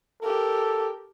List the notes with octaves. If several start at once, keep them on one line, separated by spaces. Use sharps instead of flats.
G4 A4 A#4